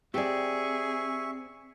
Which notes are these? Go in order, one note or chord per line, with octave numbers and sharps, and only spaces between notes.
C4 G4 G#4 D5 E5 C#6